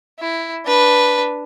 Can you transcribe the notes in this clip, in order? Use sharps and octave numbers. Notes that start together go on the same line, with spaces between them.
E4
D4 B4